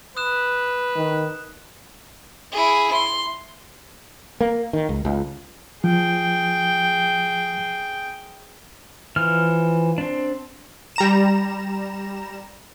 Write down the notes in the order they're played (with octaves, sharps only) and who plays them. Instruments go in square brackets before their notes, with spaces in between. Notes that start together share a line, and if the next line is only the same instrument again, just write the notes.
[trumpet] B4 [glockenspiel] D#6 F#6 E7
[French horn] D#3
[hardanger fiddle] E4 G#4
C6
[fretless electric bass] A#3
D#3
C#2
C#2
[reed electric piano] F3 [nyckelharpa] G#4 G5
[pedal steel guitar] E3 F3 F6
C4 D4
[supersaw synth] G3 A#5 E7